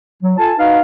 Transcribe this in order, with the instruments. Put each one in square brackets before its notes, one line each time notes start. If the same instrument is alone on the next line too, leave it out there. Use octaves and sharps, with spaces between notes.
[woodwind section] F#3
F4 A4 G#5 A5
D#4 F#4 B4 F5